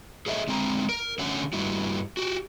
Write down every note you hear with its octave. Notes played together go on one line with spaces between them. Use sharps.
G#4 A4 C#5 D#5 E5
D3 G#3 C4 A#5
A#4
D3 A3 C#4 C#5 F#5
G2 G3 E4 F#4
F#4 G4